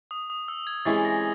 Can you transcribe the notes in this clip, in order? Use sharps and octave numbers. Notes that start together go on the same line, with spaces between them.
D#6
D#6
E6
G#6
C3 E3 G#3 C#4 E4 A6
A#6